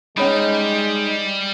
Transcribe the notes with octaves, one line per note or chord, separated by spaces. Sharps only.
G3 G#3 C#4 D#4 C#5 B5